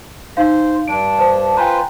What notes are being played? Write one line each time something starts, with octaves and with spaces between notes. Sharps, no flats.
D#4 C5 F5
G2 D4 D7
C5 A5
F4 B4 C5 G5 G#5 A#5